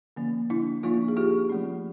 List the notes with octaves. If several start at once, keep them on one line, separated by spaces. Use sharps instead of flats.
D3 F3 A#3 C#4
D4 E4
F3 A#3 D4 D#4 F4
G#4
F4 G4
F3 A3 C#4